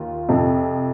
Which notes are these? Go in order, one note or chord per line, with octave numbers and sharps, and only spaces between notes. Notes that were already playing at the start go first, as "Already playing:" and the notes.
Already playing: D#2 F4
F2 C3 F3